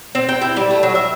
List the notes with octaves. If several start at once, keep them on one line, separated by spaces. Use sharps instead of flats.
C4
G5
E4
G3
A3
F#3
E5